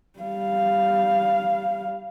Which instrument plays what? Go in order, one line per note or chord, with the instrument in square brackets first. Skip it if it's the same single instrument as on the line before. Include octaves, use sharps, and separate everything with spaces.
[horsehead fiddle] G3 F5